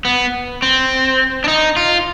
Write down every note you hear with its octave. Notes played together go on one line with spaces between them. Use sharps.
B3
C4
D4
D#4
F4